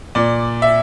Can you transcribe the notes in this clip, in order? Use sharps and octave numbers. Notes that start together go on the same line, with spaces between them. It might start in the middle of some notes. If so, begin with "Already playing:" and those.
A#2 D5
E5